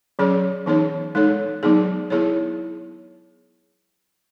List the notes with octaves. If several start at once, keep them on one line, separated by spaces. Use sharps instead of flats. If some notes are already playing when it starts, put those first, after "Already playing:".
F#3 C#4 G#4 C#5
E3 B3 D#4 G#4 C#5
G#3 D#4 A4 C#5
F#3 B3 D#4 G#4
B3 E4 G#4 C#5